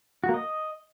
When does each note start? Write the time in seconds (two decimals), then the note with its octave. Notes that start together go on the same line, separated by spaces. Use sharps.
0.24 F#4
0.29 A#3
0.34 D#5